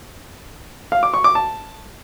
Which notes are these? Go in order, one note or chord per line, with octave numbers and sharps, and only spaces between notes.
F5
D6
C#6
D6
A5